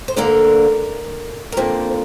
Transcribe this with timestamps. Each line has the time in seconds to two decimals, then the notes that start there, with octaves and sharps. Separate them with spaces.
0.08 C5
0.16 D2 D3 A#3 A#4
1.52 A#4
1.57 F2 D3 F3 A#3 C5